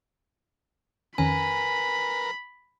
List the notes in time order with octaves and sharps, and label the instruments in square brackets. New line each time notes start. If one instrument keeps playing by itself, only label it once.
[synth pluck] F2 D#3 C#4 [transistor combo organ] A#4 B4 [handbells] G#5 [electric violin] B5